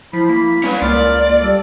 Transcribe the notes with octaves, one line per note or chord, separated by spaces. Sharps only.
F3 E4 B5
A#3
G3 C#4 B4
C#2 A#3 F4 D5
G3 A4